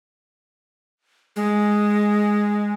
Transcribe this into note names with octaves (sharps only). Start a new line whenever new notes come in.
G#3